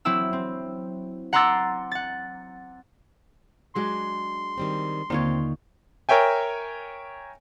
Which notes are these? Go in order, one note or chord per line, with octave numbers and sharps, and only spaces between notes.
F#3 C4 E4 E6
C4
F#5 A#5 C6 D6 E6 A6
F#5 A6
F#3 G#3 D4 C6
D#3 G3 C4
D#2 D3 D#3 A#3 C4 F4 C#5
A#4 C#5 E5 G5 G#5